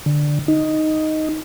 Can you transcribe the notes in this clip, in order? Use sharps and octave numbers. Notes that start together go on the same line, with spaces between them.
D3
D#4